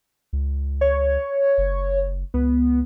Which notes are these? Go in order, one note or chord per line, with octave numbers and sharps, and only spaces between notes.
C#2
C#5
F#1
C#2 B3